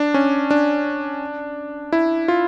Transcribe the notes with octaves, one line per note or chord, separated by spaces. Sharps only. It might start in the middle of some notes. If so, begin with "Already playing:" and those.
Already playing: D4
C#4
D4
E4
F4